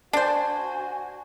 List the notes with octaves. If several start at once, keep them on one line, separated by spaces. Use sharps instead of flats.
D4 F#4 C5 G#5 A5